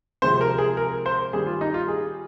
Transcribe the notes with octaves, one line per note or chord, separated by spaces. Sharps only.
C3 F3 G#3 C4 C5
A#4
G#4
A#4
C5
D#3 G3 C4 G#4
F4
D#4
F4
G#4